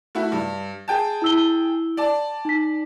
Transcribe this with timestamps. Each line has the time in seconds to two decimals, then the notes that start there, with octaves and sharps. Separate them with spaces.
0.15 A3 E4 F#4
0.32 G2
0.88 G#4 G5 A5
1.22 E4 E6 G7
1.97 D5 A5
2.45 D#4 B6